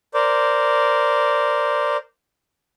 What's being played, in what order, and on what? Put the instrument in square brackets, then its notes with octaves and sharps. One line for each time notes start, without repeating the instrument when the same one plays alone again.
[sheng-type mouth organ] A#4 C5 D5